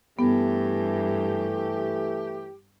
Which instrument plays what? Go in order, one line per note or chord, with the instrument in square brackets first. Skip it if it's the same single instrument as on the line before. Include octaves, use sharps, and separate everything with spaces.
[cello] G2 [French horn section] E3 A3 [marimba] B3 [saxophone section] G4